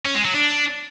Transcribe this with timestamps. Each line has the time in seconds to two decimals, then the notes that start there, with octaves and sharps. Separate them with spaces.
0.05 C#4
0.15 G#3
0.25 F#3
0.34 D4